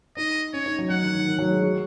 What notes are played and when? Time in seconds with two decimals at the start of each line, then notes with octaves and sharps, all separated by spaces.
0.17 D#4 D#5
0.53 C#4 C#5
0.66 D#4
0.79 F#3
0.90 F#3 F#5
1.02 D#3
1.15 D#3
1.26 D#3
1.38 F#3
1.50 G#3
1.62 F#4